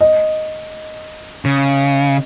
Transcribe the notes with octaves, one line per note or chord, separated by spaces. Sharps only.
D#5
C#3